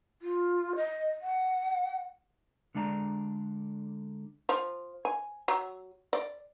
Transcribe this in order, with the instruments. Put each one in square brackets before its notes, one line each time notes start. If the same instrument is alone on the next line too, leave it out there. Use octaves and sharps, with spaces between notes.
[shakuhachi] F4
D#5
F#5
[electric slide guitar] D3 G#3 D4 D5 A#5
[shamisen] F3
G#5
F#3
D5